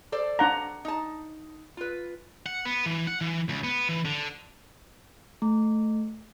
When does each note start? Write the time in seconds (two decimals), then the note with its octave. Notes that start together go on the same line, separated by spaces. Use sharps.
0.12 A4 C5 D5
0.39 D4 F#5 A#5
0.85 D#4 A5
1.77 F4 B4
2.46 F#5
2.65 B3
2.86 E3
3.07 F#5
3.21 E3
3.49 C#2
3.64 B3
3.89 E3
4.05 D3
5.42 A3